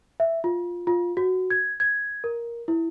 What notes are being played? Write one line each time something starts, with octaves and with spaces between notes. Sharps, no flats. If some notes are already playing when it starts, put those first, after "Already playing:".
E5
F4
F4
F#4
G#6
G#6
A#4
E4